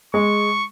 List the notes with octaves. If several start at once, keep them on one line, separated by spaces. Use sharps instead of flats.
G#3 C#6